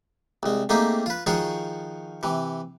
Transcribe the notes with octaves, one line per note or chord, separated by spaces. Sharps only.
C2 G#3
A3 A#3 C4 D#4 G4 G#4
F4 B4
D#3 F3 F4 F#4 G#4 C#5
C3 E3